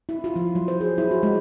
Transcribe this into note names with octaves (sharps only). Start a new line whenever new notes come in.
E4
F4
F3
F#3
C5
G#4
E4
F#4
G#3